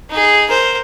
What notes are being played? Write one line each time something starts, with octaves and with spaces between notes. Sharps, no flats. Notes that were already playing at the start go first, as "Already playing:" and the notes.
D#4 G#4
A#4 C5